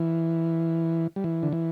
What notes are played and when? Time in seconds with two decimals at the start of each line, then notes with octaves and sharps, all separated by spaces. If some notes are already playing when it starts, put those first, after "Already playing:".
Already playing: E3
1.16 G3
1.24 E3
1.43 D3
1.53 E3